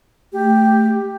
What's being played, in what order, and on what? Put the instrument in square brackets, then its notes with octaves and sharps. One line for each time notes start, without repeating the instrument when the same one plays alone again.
[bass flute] A3 [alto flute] G4